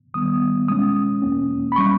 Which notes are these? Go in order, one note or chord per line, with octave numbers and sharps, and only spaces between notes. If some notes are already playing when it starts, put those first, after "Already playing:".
D#2 D#3 G3 B3 D#6
B2 G#3 C#4 D#6
E2 B2 A#3 C#4
B5
G3 C#4 C#6